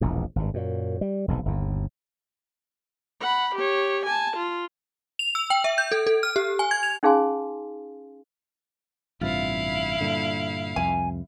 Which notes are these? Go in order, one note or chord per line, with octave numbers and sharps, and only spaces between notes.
E1 A#1 E2
G#1 G2
F#2 A#2
G3
F1 B1 G#2
G1 D#2
F#5 B5
G4 C#5
G#5 A5
F4
F7
E6
G5
E5
G6
A4
A4
F6
G4
G#5
G#6
F7
C#4 D#4 G#4 F5 G#5 C6
A1 G2 C3 E4 F4 F5
G2 A#2 D3
C2 F2 G#5